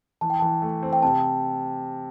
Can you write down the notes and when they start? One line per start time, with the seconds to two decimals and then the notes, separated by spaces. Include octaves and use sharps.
0.21 E3 A5
0.30 G5
0.40 E3 A5
0.62 A3
0.83 C4
0.93 G5
1.02 C3 A5